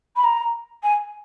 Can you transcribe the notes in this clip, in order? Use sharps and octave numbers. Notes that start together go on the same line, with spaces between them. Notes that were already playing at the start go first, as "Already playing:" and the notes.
B5
A#5
G#5